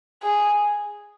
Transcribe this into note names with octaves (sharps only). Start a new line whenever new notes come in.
G#4